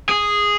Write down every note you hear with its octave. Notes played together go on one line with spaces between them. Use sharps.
G#4